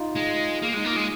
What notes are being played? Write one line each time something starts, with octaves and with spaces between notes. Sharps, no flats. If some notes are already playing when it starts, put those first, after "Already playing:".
Already playing: D#4 F4
G#3
A#3 G#4
G#3 D#4
A#3
F4
G#3